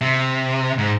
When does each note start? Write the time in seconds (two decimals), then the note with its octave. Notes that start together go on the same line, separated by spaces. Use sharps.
0.01 C3
0.78 G#2